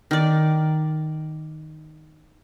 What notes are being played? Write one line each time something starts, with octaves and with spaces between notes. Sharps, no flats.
D#3 D5